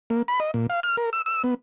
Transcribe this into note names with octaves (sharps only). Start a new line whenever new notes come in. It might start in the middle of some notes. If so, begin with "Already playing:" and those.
A#3
B5
D#5
A#2
F5
F6
A#4
E6
E6
B3